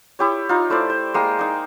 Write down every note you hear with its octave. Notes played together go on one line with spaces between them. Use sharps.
E4 G4 C#5
D#4 F4
A3 E4 C5 D5
C5
G#3 A#3 G5
A#3 D#4